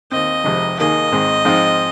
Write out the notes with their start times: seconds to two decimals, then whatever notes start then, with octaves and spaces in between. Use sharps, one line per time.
0.11 D#2 D#3 C4 D#5
0.44 F1 F2 C3 G#3
0.78 D#2 D#3 A#3 G#4 D#5
1.12 G#1 G#2 G#3 C4
1.45 G#2 F3 G#3 C4 F4